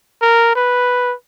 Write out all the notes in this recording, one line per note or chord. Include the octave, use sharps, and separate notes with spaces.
A#4
B4